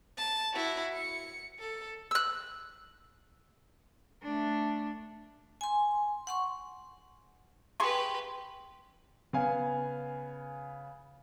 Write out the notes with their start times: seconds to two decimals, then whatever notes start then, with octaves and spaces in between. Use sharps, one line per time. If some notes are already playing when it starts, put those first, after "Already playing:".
0.17 A5
0.54 E4 F#4
0.93 C#7
1.59 A4
2.11 E6 F#6
4.23 A3 D4
5.61 G#5 C6
6.27 F#5 C6 C#6
7.80 G4 G#4 B4 C6 C#6
9.33 C#3 B3 F5 G#5